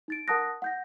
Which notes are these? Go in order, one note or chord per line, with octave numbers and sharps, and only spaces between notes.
D#4 A6 D7
A#4 F#5 A5 D#6 F#6 A#6
F#5 G6 A#6